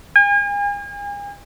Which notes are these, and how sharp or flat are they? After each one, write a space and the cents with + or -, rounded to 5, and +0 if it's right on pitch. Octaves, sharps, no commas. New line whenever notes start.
G#5 -40